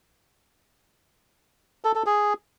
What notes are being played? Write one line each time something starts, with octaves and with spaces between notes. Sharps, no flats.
A4
A4
G#4